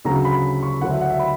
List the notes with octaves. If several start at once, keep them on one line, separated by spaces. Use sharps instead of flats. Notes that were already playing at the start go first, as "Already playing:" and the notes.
D2 C#3 F#3 A#5
B5
C#6
D2 D3 F#3 F#5
E5
F#5
E5
B5